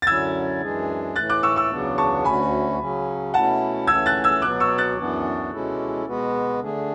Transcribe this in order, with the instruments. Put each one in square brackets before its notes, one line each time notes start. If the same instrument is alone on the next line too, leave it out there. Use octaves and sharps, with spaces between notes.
[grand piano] A6
[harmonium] F#2 D3 F#3 C#4 E4 [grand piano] E6 G#6
[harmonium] F#2 E3 G#3 D4 G#4
[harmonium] A2 E3 A3 [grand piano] F#6 A6
[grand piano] D6 F#6
C#6 E6
C#6 E6
[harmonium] E2 C#3 F#3 B3 D4
[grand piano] A5 C#6
[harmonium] D2 D3 A3 C#4 F#4 [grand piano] G#5 B5
[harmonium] C#3 F#3 C#4
[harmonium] B2 A3 C#4 E4 [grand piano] F#5 A5
[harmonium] E3 A3 C#4 [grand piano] E6 G#6
[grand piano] F#6 A6
E6 G#6
[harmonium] B2 F#3 B3 [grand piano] D6 F#6
[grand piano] C#6 E6
F#6 A6
[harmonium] F#2 E3 B3 D4
B2 G#3 C#4 E4 A4
B2 G#3 B3 F#4 B4
D3 A3 D4 G#4